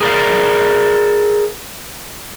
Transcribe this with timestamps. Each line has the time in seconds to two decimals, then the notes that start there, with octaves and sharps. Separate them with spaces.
0.01 G#4 A#4 D5 F5